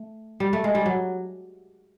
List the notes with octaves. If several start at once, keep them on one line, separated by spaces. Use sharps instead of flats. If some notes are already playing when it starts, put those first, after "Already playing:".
Already playing: A3
G3
A3
G#3
G3
F#3